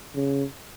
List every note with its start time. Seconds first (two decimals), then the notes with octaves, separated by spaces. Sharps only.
0.15 C#3